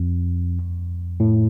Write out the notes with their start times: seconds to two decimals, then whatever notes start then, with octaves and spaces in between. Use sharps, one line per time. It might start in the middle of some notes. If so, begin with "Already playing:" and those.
Already playing: F2
1.20 A2